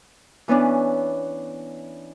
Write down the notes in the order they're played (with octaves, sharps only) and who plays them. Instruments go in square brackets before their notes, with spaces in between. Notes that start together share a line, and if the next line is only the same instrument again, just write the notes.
[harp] E3 B3 C#4 D4